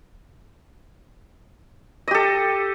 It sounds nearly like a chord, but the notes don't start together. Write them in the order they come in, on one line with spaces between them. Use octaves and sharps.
D#5 G4 A4